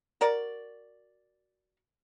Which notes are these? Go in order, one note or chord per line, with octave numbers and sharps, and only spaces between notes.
F#4 A#4 D5